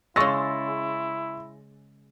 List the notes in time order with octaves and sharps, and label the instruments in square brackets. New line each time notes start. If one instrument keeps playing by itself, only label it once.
[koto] C#3 G#3 [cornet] E4 [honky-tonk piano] C6 E6 [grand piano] C#6 A6 A#6